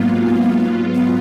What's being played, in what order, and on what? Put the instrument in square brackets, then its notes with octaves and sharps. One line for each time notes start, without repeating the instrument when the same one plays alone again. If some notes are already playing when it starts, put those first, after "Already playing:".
Already playing: [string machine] G#2 F#3 B3 F4 [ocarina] A#3
[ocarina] B3